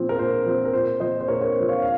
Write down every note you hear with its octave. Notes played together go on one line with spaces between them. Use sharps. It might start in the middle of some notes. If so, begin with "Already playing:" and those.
Already playing: A#2 F3 C4
A#4
A#2 C5
F3 C4
A#4
A#2 C5
F3 C4 C5 D#5
C5
A#2 A#4 C#5
A#4 C#5
C4
F3
C#5 F5
F5